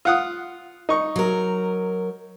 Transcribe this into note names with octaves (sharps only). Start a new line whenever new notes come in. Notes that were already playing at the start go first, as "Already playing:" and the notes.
F4 F#5 D#6
D#4 C#6
F#3 A#4